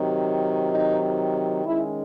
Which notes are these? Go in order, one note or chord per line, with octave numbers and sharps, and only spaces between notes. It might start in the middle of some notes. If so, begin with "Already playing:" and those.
Already playing: C3 D#3 F#3
D#4
D#3 G#3 C#4 E4